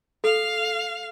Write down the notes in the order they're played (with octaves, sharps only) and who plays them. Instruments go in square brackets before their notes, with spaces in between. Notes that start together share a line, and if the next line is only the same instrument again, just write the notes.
[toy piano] A4 [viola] F5